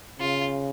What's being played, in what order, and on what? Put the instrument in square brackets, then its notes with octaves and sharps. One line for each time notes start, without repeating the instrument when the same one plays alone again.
[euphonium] C#3 [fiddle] F4